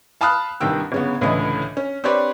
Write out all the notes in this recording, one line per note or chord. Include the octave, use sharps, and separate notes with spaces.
F5 A5 B5 D#6 F6 F#6
C2 G2 D#3 G5 E6
G1 C#3 B3
C#2 A2 D3 E3 D#5
C#4
C4 D4 G4 B4 C#5 D5